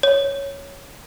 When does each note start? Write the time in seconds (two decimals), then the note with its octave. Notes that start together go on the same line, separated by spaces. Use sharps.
0.03 C#5